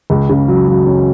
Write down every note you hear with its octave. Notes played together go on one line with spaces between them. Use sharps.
C#2
C#3
F#3
F#3
C#4